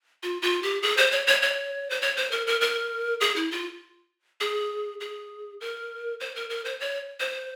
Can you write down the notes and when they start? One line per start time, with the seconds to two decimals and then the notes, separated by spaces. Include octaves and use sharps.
0.23 F4
0.42 F4
0.63 G4
0.82 G#4
0.97 C5
1.12 C#5
1.27 C#5
1.42 C#5
1.90 C5
2.02 C#5
2.17 C5
2.31 A#4
2.47 A#4
2.61 A#4
3.21 G#4
3.36 E4
3.51 F4
4.41 G#4
5.00 G#4
5.61 A#4
6.20 C5
6.36 A#4
6.50 A#4
6.65 C5
6.80 C#5
7.20 C5